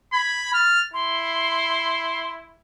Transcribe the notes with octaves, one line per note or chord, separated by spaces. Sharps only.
B5 G#6
F6 A6
E4 C6